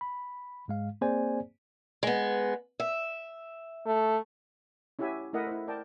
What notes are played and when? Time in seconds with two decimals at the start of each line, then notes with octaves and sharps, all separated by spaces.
0.01 B5
0.68 G#2 G#3 F5
1.01 A#3 C4 G#4 C5 D5 G#5
2.03 G#3 B3
2.80 E5
3.86 A3
4.99 C#4 E4 F#4 G4 E5 G#5
5.33 A3 E4 A#4 D#5 E5 F#5
5.47 E4 C5
5.67 A#4 D5 G5 A5